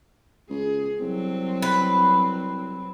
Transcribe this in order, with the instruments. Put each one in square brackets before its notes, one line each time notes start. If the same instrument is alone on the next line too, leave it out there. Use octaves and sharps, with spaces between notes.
[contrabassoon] C#2 [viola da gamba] G#4
[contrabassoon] C2 [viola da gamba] F#3 C4
[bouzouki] B4